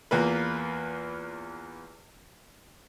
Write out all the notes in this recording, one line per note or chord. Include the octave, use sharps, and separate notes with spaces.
E2 A#3 F4 B4